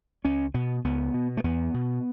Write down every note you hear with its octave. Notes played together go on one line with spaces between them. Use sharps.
C#2 C#4
B2 B3
C#2 B3
B2
A3
E2 B3
B2